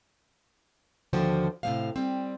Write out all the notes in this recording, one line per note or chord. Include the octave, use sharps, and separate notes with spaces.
D#2 D3 F3 F#4 C5 G5
A2 C3 F#3 G#3 C5 F5
G3 C4